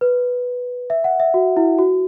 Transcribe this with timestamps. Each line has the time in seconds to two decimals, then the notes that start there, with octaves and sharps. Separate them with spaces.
0.01 B4
0.90 E5
1.04 F#5
1.20 E5
1.34 F#4
1.57 E4
1.79 F#4